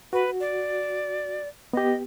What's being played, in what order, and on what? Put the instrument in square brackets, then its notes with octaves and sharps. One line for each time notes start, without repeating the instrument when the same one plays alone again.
[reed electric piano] F#4 [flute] B4
[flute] D5
[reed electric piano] B3 G4 [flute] D#5